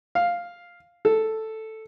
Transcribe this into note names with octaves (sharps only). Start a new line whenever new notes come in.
F5
A4